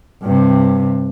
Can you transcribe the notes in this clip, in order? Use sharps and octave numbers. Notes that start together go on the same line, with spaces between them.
G2 C3